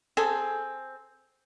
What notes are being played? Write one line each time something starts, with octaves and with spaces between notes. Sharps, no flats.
C4 G#4 A4 G#5